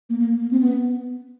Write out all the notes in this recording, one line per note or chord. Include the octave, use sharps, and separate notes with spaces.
A#3
A#3
A#3
C4
B3